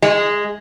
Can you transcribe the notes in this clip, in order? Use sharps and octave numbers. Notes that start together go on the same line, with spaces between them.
G#3